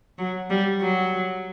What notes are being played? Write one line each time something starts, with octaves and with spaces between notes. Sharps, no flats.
F#3
G3
F#3